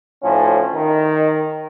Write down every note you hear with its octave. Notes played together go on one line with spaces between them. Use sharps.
D2 A2 F3 C#4
D#3